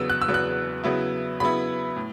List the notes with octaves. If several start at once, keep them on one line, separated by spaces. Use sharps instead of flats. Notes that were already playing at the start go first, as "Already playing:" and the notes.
Already playing: E2 C#3 F#3 B3 E6
F#6
E6
E2 C#3 F#3 B3
F#6
C#3 F#3 B3 E4
C#3 F#3 B3 E4 B5
A2